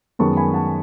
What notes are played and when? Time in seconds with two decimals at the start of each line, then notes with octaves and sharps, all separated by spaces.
0.19 F#2 D#3 G#3 B3 A5 C#6
0.37 G#5 B5
0.54 F#5 A5